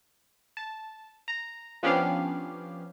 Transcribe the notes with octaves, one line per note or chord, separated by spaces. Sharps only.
A5
A#5
F3 B3 C#4 D4 G4 F5